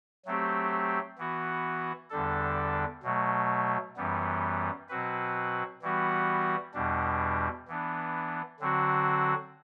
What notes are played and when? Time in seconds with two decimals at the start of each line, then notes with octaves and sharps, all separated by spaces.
0.25 F#3 A3 C4 G4
1.18 E3 B3 F#4
2.10 E2 D3 G3 D4 A4
3.03 B2 F#3 A3
3.96 F#2 E3 G3 B3
4.89 B2 F#3 C4 F#4 B4
5.82 E3 G3 B3 F#4
6.74 E2 B2 G3 D4
7.68 E3 B3 D4
8.60 D3 F#3 C4 F#4